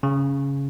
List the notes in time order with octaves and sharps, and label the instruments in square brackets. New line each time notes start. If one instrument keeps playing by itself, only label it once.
[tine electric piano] C#3